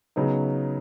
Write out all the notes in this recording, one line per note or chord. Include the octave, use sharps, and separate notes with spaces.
C#3 F#3 B3 D#4